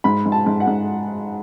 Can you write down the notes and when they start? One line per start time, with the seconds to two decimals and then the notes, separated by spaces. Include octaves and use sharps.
0.04 G#2 B5
0.25 G#2
0.32 A5
0.46 G#2
0.60 F#5
0.67 G#2